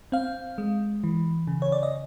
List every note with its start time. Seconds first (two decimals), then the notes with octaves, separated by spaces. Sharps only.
0.12 C4 F5
0.58 G#3
1.04 E3
1.47 C#3
1.62 C#5
1.72 D5
1.83 D#5